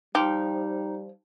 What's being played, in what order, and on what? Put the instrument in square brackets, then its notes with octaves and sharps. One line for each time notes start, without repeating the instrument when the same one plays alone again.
[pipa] F3 [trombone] G3 [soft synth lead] D#4 [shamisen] G4